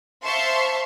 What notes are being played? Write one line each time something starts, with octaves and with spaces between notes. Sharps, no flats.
C5 E5 F5 A5 C6 C#6